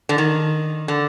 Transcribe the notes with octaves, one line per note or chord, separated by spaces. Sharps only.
D3
D#3
D3